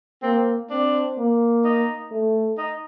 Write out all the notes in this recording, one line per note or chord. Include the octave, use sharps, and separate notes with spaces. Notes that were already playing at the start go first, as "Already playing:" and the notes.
A#3 C4
C4 D4
A#3
D#4
A3
D#4